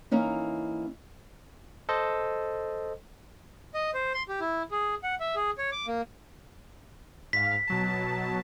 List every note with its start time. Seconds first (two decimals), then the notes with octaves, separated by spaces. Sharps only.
0.11 E3 A#3 C#4 D#4
1.89 A4 C5 D#5
3.74 D#5
3.94 C5
4.14 C6
4.29 G4
4.40 E4
4.72 G#4
5.04 F#5
5.20 E5
5.36 G#4
5.58 C#5
5.72 D6
5.87 A#3
7.33 G#2 F5 B6
7.67 B2 F#3 A5